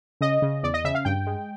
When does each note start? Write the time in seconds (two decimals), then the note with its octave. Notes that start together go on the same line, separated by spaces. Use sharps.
0.21 C#3 D#5
0.42 C#3
0.63 E2 D5
0.74 D#5
0.84 C#3 E5
0.95 F5
1.05 G2 G5
1.26 G#3